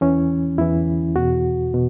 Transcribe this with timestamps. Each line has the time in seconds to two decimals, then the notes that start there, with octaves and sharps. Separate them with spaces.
0.01 E2 E3 C#4
0.58 E2 E3 E4
1.16 E2 B2 F#4
1.74 B2